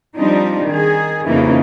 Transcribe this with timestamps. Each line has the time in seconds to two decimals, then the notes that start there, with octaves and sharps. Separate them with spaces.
0.17 F3 G3 C4 D4 D#4
0.69 D#3 G#4
1.27 F2 C#3 E3 A#3 D#4